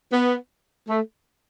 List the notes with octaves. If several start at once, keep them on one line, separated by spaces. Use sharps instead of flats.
B3
A3